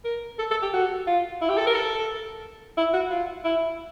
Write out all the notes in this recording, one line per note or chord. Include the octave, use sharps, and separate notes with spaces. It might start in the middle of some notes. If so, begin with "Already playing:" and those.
A#4
A4
A4
G4
F#4
F4
E4
G4
A4
A#4
A4
E4
F#4
F4
E4